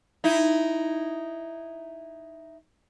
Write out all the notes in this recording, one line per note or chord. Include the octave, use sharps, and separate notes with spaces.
D#4 E4